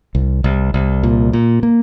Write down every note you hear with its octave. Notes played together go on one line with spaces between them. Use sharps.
C2
C2
C2
A#2
A#2
A#3